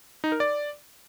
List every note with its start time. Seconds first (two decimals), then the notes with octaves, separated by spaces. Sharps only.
0.24 D#4
0.32 A#4
0.40 D5